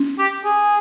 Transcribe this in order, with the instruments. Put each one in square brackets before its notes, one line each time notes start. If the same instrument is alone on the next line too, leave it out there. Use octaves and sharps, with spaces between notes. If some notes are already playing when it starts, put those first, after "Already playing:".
Already playing: [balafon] C#4
[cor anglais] G4
G#4